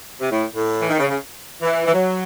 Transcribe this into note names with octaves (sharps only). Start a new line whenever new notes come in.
C3
A2
A2
E3
D#3
C#3
C#3
E3
E3
F#3